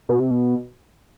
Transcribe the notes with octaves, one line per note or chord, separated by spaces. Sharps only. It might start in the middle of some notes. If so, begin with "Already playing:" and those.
B2
C3
B2